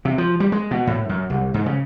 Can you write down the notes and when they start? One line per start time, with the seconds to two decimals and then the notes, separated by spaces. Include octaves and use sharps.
0.05 C3
0.18 F3
0.40 G3
0.52 G#3
0.71 B2
0.87 A2
1.09 F#2
1.30 C2
1.54 G#2
1.66 C#3